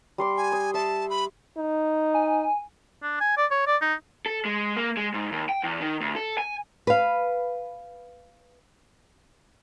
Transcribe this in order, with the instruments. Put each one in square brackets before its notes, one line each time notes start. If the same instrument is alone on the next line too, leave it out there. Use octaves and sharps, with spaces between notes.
[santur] G3 C6 D6
[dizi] G#5
[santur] D#6
[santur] E5 [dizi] A5
[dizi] B5
[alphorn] D#4
[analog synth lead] G#5
[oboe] D4
G#5
D5
C#5
D5
D#4
[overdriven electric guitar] A4
G#3
A#3
G#3
G#2
D#2
G5
E2
D#3
D2
A4
G#5
[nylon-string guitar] B4 F5